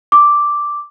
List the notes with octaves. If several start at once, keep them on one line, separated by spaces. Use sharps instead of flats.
D6